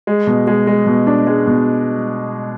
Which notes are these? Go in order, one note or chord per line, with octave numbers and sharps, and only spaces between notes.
G#3
B2
G#3
G#3
B2
D4
G#3
B2